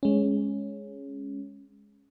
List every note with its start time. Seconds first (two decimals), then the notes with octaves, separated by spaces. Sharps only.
0.03 G#3 C#4